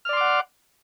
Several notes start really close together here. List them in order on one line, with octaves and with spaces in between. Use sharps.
F6 D5 C6 D6 F#5